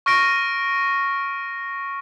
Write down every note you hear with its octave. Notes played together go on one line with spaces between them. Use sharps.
C#6 F6 A#6 D7